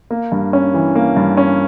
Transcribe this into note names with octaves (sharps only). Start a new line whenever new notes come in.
A#3
G2
C#4
E3
A#3
G2
C#4